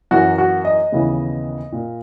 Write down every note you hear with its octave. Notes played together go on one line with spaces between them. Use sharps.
F#2 E3 A#3 F#4
F#4
D#5
D#2 C#3 E3 B3
A#2 A#3